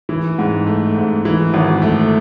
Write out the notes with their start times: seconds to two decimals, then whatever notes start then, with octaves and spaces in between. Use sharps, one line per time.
0.09 E3
0.38 G#2
0.67 A3
0.96 G#2
1.25 E3
1.54 G#1
1.82 A3